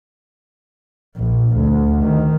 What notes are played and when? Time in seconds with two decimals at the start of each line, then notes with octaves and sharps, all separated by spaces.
1.17 A#1
1.56 D2
2.02 D#3